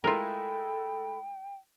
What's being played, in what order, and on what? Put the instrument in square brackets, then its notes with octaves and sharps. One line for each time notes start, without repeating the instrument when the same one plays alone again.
[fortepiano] G#3 A3 E4 [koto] F4 A#4 [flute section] A4 B5 [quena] G5